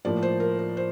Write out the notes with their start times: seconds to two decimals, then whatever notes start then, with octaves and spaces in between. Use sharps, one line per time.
0.05 A2 F3 A#3 D5
0.23 C5
0.40 A#4
0.59 A#4
0.77 C5